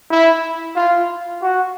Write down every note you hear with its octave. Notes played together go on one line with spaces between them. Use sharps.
E4
F4
F#4